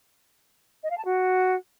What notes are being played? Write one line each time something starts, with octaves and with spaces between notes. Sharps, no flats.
D#5
F5
A5
F#4